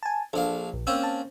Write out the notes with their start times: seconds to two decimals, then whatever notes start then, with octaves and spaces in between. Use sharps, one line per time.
0.03 G#5 A5
0.33 A#1 D4 A4 F5
0.73 A#1
0.87 A#3 C4 C#4 E6
1.03 A5